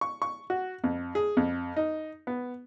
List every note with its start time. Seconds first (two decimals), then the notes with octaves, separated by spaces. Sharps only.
0.01 C#6
0.22 C#6
0.50 F#4
0.84 F2
1.15 G#4
1.37 F2
1.76 D#4
2.27 B3